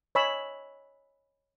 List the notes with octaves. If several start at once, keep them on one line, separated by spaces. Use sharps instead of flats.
C#5 D#5 G#5 B5 C#6 E6